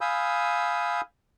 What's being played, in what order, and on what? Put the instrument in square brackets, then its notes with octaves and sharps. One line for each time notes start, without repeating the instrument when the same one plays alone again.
[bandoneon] F5 G#5 B5 D#6 E6 G6